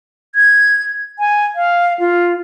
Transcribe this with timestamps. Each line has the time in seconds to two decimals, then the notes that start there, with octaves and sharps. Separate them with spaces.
0.35 G#6
1.19 G#5
1.55 F5
1.99 F4